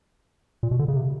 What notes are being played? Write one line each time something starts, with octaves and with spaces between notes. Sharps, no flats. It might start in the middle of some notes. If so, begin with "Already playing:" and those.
A#2
B2
D3
C#3
C3